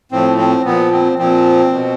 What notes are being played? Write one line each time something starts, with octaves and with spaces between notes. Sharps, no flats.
A2 F3 C4
C4
A#2 F3 B3
C4
A#2 F3 C4
B2